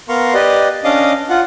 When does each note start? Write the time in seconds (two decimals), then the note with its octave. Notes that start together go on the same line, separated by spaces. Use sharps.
0.09 B3 A#4 F5 A#5 C6 C#6
0.34 G4 B4 D5 D#5
0.84 C#4 D4 D#5 F5 D6 D#6
1.30 F4 F#5